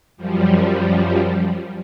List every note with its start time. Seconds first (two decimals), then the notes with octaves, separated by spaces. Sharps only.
0.17 F#2 F3 G3